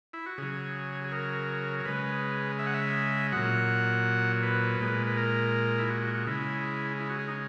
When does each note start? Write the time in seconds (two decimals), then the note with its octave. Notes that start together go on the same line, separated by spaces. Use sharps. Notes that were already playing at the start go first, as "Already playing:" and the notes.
0.13 E4
0.26 F#4
0.38 C#3 F#3 G#4
1.04 G#4
1.12 A#4
1.80 A#4
1.85 C#3 G#3 B4
2.59 E5
2.67 F#5
2.74 E5
3.32 A#2 F#3 F#5
4.43 B4
4.80 A#2 G#3
5.07 B4
5.17 A#4
5.79 E4
5.89 F#4
6.02 F#4
6.15 F#4
6.27 C#3 G#3 E4
7.00 E4
7.10 F#4
7.19 G#4
7.28 D#4